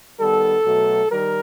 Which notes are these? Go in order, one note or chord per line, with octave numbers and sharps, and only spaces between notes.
D#3 G3 B3 A4
B2 F#3 A3
D#3 G3 A#4